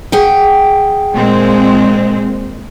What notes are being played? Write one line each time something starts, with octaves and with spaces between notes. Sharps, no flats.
G#4 F#5 G5
A#2 G#3 C4